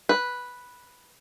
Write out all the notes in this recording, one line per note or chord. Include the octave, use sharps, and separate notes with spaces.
B4